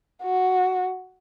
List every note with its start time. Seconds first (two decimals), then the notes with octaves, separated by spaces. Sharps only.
0.23 F#4